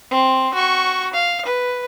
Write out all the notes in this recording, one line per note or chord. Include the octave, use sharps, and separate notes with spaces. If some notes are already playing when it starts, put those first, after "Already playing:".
C4
F#4 C#6
F5
B4